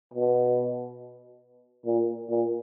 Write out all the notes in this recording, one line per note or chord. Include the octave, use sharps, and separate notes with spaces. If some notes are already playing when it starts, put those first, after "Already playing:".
B2
A#2
A#2